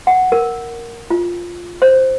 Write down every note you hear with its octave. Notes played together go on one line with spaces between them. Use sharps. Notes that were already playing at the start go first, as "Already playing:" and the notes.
F#5
A#4
F4
C5